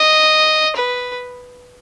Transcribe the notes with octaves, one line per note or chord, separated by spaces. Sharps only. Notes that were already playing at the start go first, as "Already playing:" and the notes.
Already playing: D#5
B4